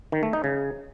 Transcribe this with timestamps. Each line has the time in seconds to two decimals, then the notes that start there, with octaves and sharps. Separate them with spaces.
0.12 D#3
0.23 A3
0.33 D#4
0.44 C#3